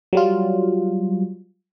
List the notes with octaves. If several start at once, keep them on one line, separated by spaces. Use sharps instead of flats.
F#3 G3 F4